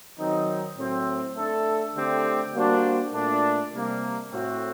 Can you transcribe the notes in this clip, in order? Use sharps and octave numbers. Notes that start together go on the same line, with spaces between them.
D#3 F#3 C4 D#4
A2 F#3 C4
A3 D4 A4
D3 A3 C4 G4
G3 A#3 D4 F#4 C5
A#2 A3 D4
C3 G3 A#3
A2 A3 C4 F#4